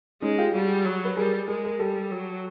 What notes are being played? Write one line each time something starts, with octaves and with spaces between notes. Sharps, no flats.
G#3 C#4 D#4
F4 G4
G3 F#4 G#4
F#3
B4
G3 G#4 A#4
G#3 G#4 A#4
G#4 A#4
G3 G4 A4
F#3